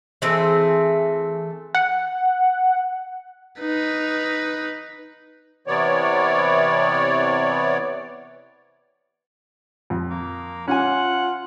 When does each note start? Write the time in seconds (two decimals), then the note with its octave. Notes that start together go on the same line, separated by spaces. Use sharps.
0.22 E3 A3 C4 G#4
1.75 F#5
3.60 D#4 B4
5.67 C3 E3 B3 C#5 D5
9.90 F2
10.10 A#3
10.68 C#4 F4 F#5 G#5